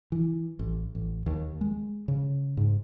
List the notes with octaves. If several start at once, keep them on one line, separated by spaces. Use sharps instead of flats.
E3
A1
A1
D#2
G#3
C#3
G#2